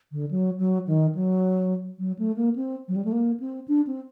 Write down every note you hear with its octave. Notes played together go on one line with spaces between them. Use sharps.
D3
F#3
F#3
D#3
F#3
F#3
A3
A#3
C4
F#3
G3
A3
A#3
C4
D4
C4